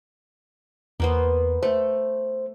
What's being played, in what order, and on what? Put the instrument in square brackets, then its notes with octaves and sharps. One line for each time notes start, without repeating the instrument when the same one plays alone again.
[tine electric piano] E2 [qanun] A#3 B3 C5
[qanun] A3 [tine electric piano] C5